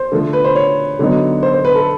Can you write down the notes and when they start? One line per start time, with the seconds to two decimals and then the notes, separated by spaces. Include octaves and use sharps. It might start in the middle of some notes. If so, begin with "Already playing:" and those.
Already playing: C5
0.12 D3 F3 A3
0.33 B4
0.44 C5
0.56 C#5
0.99 D3 F#3 B3 D#4
1.43 C5
1.54 C5
1.65 B4
1.75 A4